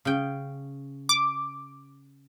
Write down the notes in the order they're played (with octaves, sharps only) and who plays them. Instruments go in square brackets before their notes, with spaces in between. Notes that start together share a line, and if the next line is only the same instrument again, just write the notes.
[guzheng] C#3 G5
[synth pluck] D6